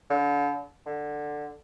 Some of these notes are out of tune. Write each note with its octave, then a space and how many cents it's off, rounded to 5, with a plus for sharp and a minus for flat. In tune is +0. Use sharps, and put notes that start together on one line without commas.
D3 -35
D3 +10